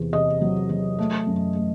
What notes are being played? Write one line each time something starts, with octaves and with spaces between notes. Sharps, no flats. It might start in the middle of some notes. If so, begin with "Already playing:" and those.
Already playing: E2 C3
C3 D#5
F#3
F#3
A3
F#2
A3